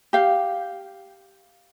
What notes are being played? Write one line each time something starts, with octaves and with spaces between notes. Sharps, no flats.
G4 F5